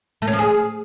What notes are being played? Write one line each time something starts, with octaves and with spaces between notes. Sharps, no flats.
A3
C#4
F3
G#4